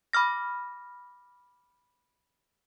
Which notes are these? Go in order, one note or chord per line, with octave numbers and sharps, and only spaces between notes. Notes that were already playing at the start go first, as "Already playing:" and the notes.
B5 D6 F6 A#6